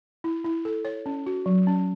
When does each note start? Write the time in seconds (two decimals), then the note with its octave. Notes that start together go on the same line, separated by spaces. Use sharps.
0.24 E4
0.44 E4
0.65 A4
0.85 C#5
1.06 C#4
1.26 F#4
1.46 F#3
1.67 C#4